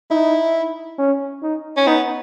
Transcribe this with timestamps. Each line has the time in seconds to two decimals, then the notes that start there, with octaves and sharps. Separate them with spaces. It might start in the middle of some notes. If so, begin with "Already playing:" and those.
0.10 D#4 E4
0.98 C#4
1.43 D#4
1.77 C#4
1.86 B3 D#4